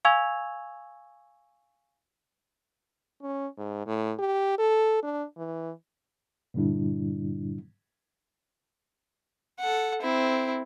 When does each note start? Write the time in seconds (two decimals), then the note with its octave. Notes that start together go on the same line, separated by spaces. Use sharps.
0.05 F5 G#5 C#6 E6 G#6 F7
3.22 C#4
3.58 G#2
3.87 A2
4.19 G4
4.58 A4
5.03 D4
5.37 E3
6.54 G2 A#2 D3 G3 D4 E4
9.60 A4 F#5
10.02 C4 E4